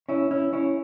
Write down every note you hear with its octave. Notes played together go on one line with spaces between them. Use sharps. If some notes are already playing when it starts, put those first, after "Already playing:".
C#4 E4
C#4 E4
C#4 E4